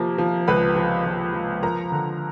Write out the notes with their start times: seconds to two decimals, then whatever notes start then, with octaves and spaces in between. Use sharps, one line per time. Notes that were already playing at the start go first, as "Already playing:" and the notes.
Already playing: C3 F3 A#3 A#5
0.18 F3
0.47 C#2 B4 B5
0.76 F3
1.06 F3
1.34 F3
1.63 F3 A#4 A#5
1.92 D3